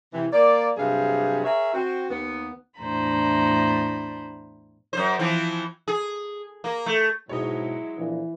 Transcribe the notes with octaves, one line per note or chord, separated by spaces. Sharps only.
C3 E3
A#3 D5
G2 C3 F#3 G#4 F5
G#4 A#4 C#5 E5
C4 F#4
D#2 B3
E2 A2 D4 C5 A#5 B5
F#2 C5
E3 F3 C4
G#4
A#3
A3
G#2 B2 F#3 G#3 E4 C#5 D#5
A#1 E3